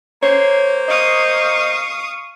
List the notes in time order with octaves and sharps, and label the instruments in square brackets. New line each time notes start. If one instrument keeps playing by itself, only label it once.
[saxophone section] A#3 C5 [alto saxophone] C#5
[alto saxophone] D#5 [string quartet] F5 C#6 D#6